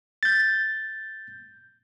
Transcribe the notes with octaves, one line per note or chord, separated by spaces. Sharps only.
G6 A6